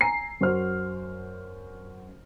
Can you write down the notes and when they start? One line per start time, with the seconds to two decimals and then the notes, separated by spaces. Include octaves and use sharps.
0.01 G#5 A#5 C7
0.41 F#2 F#4 C5 F6